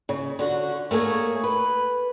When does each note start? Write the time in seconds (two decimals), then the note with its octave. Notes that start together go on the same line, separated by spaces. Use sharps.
0.09 C#3
0.39 D3 F#4
0.91 A3 A#3 G#4 C#5
1.44 B4